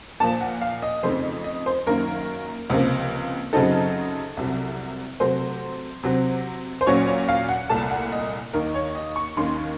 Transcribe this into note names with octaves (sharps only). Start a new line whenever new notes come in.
A#2 F3 A#3 A5
F#5
F5
D#5
F2 C#3 A3 C4 D#4 C5
D#5
C5
F#2 D#3 A#3 C#4 A#4
C#2 C3 F3 A#3
F#2 C#3 F#3 C4 D#4 A4
C2 C3 F#3
C3 F#3 A3 C5
C3 F#3 C4
C5
A#2 F#3 A#3 C#4 C#5
C#5
F5
F#5
C2 A#2 A3 A5
F#5
D#5
D#2 D#3 A#3 D#4 A#4
C#5
D#5
C#6
D#2 D#3 A#3 C#4 C6